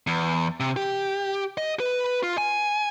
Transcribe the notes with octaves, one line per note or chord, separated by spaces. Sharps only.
E2
C3
G4
D#5
B4
F4
G#5